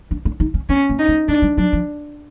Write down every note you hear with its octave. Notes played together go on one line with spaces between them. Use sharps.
D4
D4
D#4
C#4
C4 C#4
A#3
D#4
A3
G#3 D4
G3
F#3 D4
F3